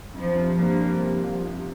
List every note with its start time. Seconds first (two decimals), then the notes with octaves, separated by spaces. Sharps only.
0.13 F2 F3
0.35 C3
0.57 G2 F3 A#3
0.79 G3
1.01 C3
1.24 F3
1.46 C3